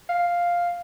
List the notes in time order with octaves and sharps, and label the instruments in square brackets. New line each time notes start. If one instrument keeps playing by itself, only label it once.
[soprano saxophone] F5